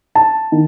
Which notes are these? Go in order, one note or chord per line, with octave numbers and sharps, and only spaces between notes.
A5
D#3